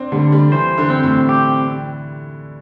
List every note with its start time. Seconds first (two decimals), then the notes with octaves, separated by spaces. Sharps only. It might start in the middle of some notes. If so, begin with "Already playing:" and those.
Already playing: C4 D4
0.12 D3 G3
0.32 G3
0.52 E3 C5
0.78 D3
0.90 C4
1.03 A2
1.29 G4